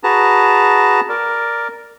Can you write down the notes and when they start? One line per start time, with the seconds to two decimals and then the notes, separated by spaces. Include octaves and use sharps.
0.04 F#4 G#4 B4 A5 A#5
1.09 A#4 D5